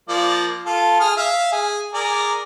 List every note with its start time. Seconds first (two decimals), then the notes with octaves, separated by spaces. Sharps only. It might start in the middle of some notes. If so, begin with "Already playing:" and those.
0.09 F3 A#3 D5
0.66 F4 A4
1.00 G#4 D#6 F6
1.17 E5 F5
1.52 G#4
1.94 G#4 A#4 D5